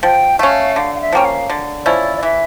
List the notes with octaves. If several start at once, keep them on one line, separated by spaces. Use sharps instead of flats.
F3 G5
A3 C#4 F5
D3 F5
F5
E5
F3 A#3 C#4 G5
F5
D3
F3 C#4 E4 D5
D5
E3 E5